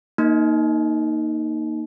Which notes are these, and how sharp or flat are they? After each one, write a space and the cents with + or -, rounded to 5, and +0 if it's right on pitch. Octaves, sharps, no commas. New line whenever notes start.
A#3 +0 D#4 +0